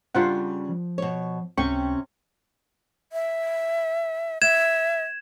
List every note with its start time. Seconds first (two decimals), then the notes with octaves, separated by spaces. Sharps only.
0.15 C#3 G3 D4 F4 C5 F#5
0.69 F3
0.98 B2 C#5
1.58 C#2 C3 C#4 G5 C#6
3.13 E5
4.42 E5 G#6 E7